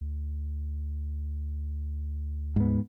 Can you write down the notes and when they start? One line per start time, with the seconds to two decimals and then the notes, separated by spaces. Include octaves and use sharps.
0.01 D2
2.56 G#2 B3